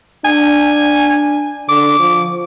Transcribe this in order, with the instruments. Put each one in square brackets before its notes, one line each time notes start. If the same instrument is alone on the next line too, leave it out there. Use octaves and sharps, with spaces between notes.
[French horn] D4 [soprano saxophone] G#5
[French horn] D3 [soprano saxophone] D6
[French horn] F3